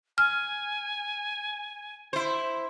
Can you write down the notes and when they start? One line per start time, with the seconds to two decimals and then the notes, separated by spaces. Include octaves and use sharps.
0.18 G#5 F6
2.13 E4 C5